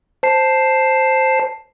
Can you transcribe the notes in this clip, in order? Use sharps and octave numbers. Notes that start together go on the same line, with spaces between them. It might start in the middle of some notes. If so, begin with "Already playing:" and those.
C5 A5 C7